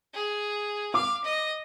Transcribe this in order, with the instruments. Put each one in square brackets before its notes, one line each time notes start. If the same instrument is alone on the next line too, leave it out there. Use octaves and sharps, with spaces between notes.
[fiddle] G#4
[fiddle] F5 [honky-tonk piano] D6
[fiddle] D#5